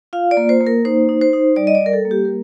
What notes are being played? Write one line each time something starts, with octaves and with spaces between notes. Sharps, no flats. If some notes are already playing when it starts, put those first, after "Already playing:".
F4 F5
D5
A#3
C5
A#3
A#4
D#4 C5
D#4
C5
D#4
G3 D5
D#5
D5
G3
A#4
A4
A#3
G4
A#4